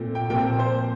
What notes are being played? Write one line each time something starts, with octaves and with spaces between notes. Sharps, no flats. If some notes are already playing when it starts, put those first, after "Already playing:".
Already playing: A#2 A3 C4
G5
A#2 F3 C4 G5
C5